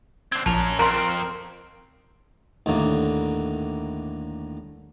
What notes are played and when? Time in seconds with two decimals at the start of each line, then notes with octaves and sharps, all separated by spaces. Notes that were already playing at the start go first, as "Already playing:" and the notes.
0.32 C4 D4 G#6
0.46 A#1 C#4 A#4 A5 F7
0.79 F2 C4 A#4 A#5 C6 C#6 F6
2.66 D#2 A2 D3 A#3